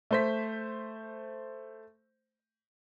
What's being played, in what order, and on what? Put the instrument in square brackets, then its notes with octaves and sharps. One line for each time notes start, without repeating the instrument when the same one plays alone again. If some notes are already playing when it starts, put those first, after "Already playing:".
[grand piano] A3 C5 B6